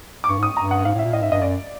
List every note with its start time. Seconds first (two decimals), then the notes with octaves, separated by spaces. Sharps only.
0.24 D6
0.29 G2 C#6
0.39 G#2 D#6
0.57 G2 A#5
0.71 F#5
0.85 G#2 F5
0.95 A2 E5
1.04 A#2
1.13 A2 D#5
1.22 G#2 E5
1.32 G2 D#5
1.41 F#2 D5